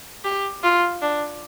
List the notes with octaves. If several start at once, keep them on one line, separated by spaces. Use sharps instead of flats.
G4
F4
D4